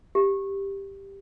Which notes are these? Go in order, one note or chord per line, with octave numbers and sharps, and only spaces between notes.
G4